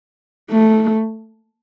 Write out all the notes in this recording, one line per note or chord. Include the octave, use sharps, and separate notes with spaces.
A3